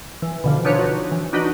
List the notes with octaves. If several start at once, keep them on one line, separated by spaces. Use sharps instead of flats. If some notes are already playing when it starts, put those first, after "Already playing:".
E3
B2 D3 F3
D4 D#4 F4 B4 C#5
F#4
E3
D4 D#4 F#4 B4 D#5